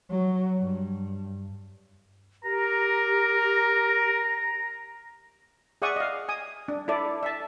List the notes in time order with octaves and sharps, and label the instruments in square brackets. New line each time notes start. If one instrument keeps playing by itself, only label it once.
[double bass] F#3
G2
[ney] G4 [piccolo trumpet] A#4 [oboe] A#5
[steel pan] G#4 D5 E5 F#5 C#6 D#6
D#5 F5
G#5 D#6
D4
E4 A4 D5
E5 A5